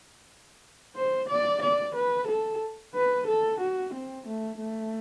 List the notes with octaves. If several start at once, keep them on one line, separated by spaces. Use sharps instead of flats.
C5
D5
D5
B4
A4
B4
A4
F#4
C4
A3
A3